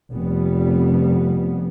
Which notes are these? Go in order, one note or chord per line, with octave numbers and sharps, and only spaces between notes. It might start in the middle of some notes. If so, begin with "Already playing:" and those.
F1 F2 G3 B3